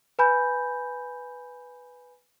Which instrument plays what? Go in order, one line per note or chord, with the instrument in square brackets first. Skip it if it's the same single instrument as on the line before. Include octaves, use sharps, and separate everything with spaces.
[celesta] B4 G#5 B5 G6